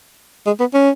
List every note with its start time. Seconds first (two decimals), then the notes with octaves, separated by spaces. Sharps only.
0.47 G#3
0.60 B3
0.74 C#4